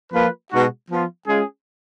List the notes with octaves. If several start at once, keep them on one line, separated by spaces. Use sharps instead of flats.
F3 A#3 F4 B4
B2 G#3 D#4 F#4
F3 B3 F4
G#3 C#4 F4 G#4